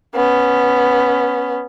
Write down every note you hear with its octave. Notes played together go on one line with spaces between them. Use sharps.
B3 C#4